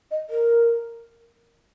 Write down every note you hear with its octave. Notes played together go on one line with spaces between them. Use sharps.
D#5
A#4